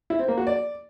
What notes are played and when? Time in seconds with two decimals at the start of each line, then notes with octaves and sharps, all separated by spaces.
0.10 E4
0.19 C4
0.28 A#3
0.38 F#4
0.47 D5